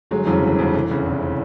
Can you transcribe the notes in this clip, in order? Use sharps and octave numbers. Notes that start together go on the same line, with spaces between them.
G1 F#3 G#3
F2 C#3 E3 F#3
G1 E3
F2 C#3
F1 E3
E2 C#3
F1
C#3